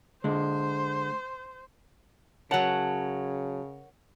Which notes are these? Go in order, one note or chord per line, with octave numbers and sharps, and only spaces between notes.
D3 G#3 C5
C#3 F#3 A#4 C#5 F#5 A5